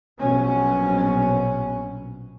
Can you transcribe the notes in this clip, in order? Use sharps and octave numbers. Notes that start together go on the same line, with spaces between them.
A#1 B2 F#3 C#4